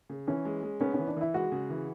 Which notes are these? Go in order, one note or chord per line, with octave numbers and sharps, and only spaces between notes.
C#3
E3 C#4
G#3
G#3
B3 C#4
E3 C#4
D4
E3 E4
G#3 F#4
C#3
E3